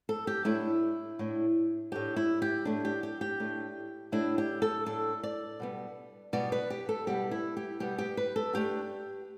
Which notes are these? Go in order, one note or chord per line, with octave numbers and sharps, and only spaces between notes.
A4
G4
A2 A3 D4 E4
A2 A3 D4
A2 A3 D4 G4
E4
G4
A2 A3 D4
G4
G4
G4
A2 A3 D4
A2 A3 D4 E4
G4
A4
A2 A3 D4 A4
D5
B2 G3 B3
B2 G3 B3 D5
B4
G4
A4
B2 G3 B3 G4
E4
G4
B2 G3 B3 G4
G4
B4
A4
D3 A3 D4 G4